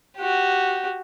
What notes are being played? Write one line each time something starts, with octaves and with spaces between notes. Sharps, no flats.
F#4 G4